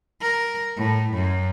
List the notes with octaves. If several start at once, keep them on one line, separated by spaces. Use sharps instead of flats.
A#4
A2
F#2